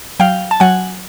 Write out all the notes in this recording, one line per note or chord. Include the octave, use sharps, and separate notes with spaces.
F#3 F5 G5
A5
F#3 F#5 G#5